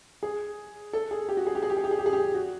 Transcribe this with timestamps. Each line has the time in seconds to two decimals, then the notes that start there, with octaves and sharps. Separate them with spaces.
0.23 G#4
0.93 A4
1.11 G#4
1.29 G4
1.37 F#4
1.47 G#4
1.55 G4
1.62 G#4
1.70 G4
1.77 G#4
1.84 G4
1.91 G#4
1.99 G4
2.06 G#4
2.13 G4
2.34 F#4